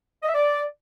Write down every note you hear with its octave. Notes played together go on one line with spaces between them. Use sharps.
D#5
E5
D5